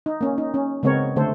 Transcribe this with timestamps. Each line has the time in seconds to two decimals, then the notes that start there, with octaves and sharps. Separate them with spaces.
0.06 D#4
0.21 A#3 C#4
0.38 D#4
0.54 C#4
0.83 C#3 G#3 B3 C4 A#4 C#5
1.16 D3 A3 A4 C5